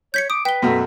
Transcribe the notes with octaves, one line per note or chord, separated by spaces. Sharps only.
C#5 G6 B6 C#7
D6 D#6
B4 G5 G7
F#2 B2 A3